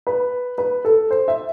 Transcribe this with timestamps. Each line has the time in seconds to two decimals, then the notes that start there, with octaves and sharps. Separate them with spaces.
0.07 B4
0.58 B4
0.85 A4
1.11 C5
1.28 E5